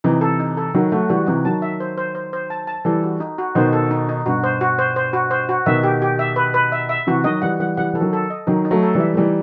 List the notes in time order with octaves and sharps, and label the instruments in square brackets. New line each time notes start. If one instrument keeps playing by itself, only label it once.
[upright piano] C3 E3 [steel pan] D#4
[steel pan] A4
D#4
A4
[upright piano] D#3 F#3 [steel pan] F#4
[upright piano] F#3 A3 [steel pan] F#4
[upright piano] E3 G3 [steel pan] F#4
[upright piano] C3 E3 [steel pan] D#4
[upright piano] D#3 F#3 [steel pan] A5
[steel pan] E5
C5
C5
C5
C5
A5
A5
[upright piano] E3 G3 [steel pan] A4
[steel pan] F#4
D#4
F#4
[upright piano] B2 D#3 [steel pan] C5
[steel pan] A4
D#4
D#4
[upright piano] G2 B2 [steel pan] F#4
[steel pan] C5
F#4
C5
C5
F#4
C5
F#4
[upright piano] B2 D#3 [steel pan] E5
[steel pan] G4
G4
E5
B4
B4
E5
E5
[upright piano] C3 E3 [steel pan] F#4
[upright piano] D#3 F#3 [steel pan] D#5
[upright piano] E3 G3 [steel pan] F#5
[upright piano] E3 G3 [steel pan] F#5
[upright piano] E3 G3 [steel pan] F#5
[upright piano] E3 [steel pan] A4
[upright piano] D#3 F#3
[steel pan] A4
D#5
[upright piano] D#3 F#3 [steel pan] D#4
[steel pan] D#4
[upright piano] F#3 A3
[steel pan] A4
[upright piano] E3 G3
[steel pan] E5
[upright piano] A3
[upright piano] E3 G3 [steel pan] D#4